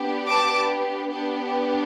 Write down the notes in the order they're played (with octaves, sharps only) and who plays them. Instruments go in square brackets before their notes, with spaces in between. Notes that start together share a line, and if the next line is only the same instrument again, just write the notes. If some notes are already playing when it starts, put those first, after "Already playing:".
Already playing: [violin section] B3 D4 G4
A5 D6
B3 D4 G4